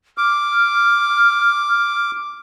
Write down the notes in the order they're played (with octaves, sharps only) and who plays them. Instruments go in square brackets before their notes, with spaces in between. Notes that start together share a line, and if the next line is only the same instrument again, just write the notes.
[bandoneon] D6 [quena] F6